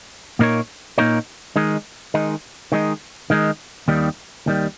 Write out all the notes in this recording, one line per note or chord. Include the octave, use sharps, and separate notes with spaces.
A#2 A#3 D#4 A#4 C#5
A#2 A#3 D#4 A#4 C#5
D#3 G#3 D#4
D#3 G#3 D#4
D#3 G#3 D#4
D#3 G#3 D#4
D#2 D#3 G3
D#2 D#3 G3